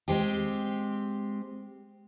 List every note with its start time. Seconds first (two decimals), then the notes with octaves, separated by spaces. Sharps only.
0.08 G#3 C4 G4